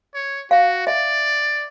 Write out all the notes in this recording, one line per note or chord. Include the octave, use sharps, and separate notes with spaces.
C#5
F#4 F5
D5 E5